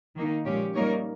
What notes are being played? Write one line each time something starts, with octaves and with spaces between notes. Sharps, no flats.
D#3 A#3 D#4
A#2 F3 G#3 C#4 G4
G3 A#3 D#4 A#4 C#5